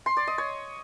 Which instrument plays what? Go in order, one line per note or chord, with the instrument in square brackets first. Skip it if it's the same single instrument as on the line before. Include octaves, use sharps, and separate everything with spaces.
[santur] C6
D5
D#5
C#5